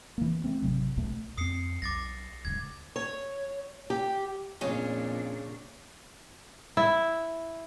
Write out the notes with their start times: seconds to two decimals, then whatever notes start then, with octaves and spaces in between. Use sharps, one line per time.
0.18 E3 A#3
0.44 A3 C4
0.62 G#1 D#2 C3 F#3
0.97 B1 B2 A3
1.38 F2 C4 D#6 C7 C#7
1.82 B1 D6 A6 A#6
2.45 D1 C#2 G#2 G#6
2.96 C#5
3.90 G4
4.61 F2 A#2 C#3 C#4 D4
6.77 E4